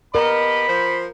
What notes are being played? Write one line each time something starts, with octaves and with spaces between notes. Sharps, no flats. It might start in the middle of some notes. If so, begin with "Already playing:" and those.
B3 G4 A#4 D#5 B5
F3 C5